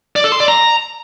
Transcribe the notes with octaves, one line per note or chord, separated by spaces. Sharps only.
D5
A4
C6
D5
A#5